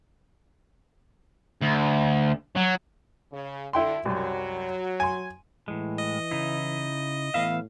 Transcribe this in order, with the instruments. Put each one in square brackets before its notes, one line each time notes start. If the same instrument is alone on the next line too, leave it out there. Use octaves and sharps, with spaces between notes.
[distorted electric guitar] D2
F#3
[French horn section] C#3
[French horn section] D3 [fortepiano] E4 G5 C6
[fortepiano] C2 F#2 [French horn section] F#3
[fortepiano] G#5 C6
[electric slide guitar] A2 G#3 [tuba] E3
[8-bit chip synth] D#5
[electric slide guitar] C#3 D#4 E4
[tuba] A2 [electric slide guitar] E3 B3 E5 [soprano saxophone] F5